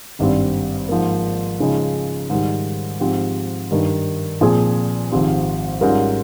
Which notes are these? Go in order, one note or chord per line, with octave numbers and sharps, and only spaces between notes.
G#1 G2 G3 C4
G#2 F3 A#3
C#3 F3 G#3 D#4
G#2 D#3 G3
G#2 F3 C4 G4
G2 D#3 G3
A#2 F3 C4 F4 G#4
G#1 G#2 F3 C4 G4
G#2 G3 C#4 F4 A#4